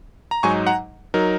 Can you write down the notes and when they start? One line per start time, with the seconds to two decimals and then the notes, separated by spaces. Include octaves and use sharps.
0.31 A#5
0.43 G#2 F#3 D#4 G#5 C#6
0.67 F#5 A#5
1.14 F#3 D#4 A#4